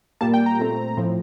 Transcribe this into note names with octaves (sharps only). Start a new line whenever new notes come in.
A#2 G3 A#3 A5
G5
A#5
A#2 A3 C4
A2 F3 C4